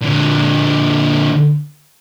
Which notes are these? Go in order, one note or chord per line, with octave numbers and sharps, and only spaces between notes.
A#2 D3